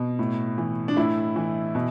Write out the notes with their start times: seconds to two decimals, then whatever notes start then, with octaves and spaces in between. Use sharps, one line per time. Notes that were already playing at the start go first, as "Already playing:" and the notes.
Already playing: B2
0.19 A2
0.58 E3
0.88 D4
0.97 A2 E4
1.36 E3
1.75 B2